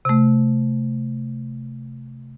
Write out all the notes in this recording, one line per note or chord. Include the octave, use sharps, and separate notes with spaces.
C3 A3